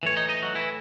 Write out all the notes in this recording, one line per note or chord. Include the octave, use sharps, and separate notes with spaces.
A2 E3 C#5
D#4 D#5
D#4 D#5
F#3 F#4
E3 E4